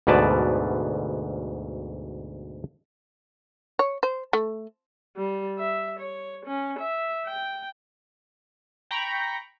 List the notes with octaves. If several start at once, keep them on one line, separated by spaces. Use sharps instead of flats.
D2 G#2 B2 B4 D5 A5
C#5
C5
A3
G3
E5
C#5
C#4
E5
G5
G5 A#5 B5 C#6